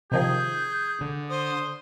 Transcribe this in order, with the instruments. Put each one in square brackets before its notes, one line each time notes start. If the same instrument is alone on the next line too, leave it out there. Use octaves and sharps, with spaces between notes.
[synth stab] C3 D#3 F3 [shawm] G#4 [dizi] G6
[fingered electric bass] D3
[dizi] C5 [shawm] D#6